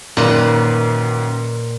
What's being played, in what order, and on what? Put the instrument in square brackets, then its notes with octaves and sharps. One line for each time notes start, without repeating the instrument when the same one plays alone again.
[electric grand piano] F#2 D#3 A#3 [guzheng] A#2 B4